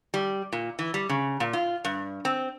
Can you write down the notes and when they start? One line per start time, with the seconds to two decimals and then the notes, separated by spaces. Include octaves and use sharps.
0.14 G3
0.53 A#2
0.79 E3
0.94 G3
1.09 C#3
1.40 A#2
1.53 F4
1.85 G2
2.25 C4